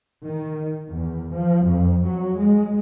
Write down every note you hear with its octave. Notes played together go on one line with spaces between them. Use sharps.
D#3
E2
F3
F2
F#3
G#3